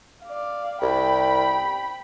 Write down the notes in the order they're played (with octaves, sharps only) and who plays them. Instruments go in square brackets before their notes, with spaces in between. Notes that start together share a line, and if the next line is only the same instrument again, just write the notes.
[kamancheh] D5 F5
[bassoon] C2 [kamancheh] G5 B5